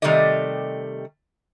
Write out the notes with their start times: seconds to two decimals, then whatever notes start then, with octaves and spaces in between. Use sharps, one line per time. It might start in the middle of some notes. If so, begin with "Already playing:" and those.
0.02 C3 D#3 G3 A3 D5 D#5